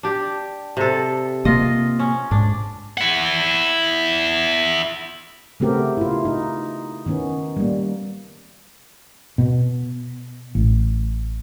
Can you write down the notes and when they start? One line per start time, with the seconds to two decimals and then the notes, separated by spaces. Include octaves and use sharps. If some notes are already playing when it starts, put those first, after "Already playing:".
0.03 D4 G4
0.77 C3 A4
1.45 C3 A#3 F4 D#5
1.99 C#4
2.31 G#2 D4
2.98 E4 F#5
5.60 C#3 A3 B3 C4 G4 A#4
5.97 E4 F4
6.25 D#4
7.06 D#3 B3 C#4
7.57 G3 A#3
9.38 B2
10.55 A1